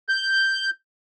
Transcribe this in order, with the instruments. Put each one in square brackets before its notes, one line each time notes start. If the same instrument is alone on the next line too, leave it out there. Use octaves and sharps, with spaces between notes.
[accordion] G6